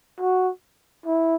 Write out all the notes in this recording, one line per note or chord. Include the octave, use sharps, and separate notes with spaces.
F#4
E4